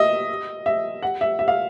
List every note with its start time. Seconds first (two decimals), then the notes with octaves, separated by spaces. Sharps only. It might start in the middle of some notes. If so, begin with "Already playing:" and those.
Already playing: D#5 E5
0.66 E5
1.03 F#5
1.21 E5
1.39 E5
1.48 F5